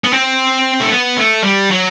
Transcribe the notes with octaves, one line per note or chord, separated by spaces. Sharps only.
B3
C4
A3
B3
A3
G3
F#3